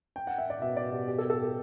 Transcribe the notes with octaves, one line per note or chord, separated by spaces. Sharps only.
G5
F#5
E5
D5
B2 E5
D5
G4
G4
A4
A4
G4